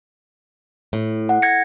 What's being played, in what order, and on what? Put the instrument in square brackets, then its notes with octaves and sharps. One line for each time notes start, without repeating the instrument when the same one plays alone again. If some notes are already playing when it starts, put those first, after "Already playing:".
[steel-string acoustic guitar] A2
[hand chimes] F#5
G#6 A#6 C#7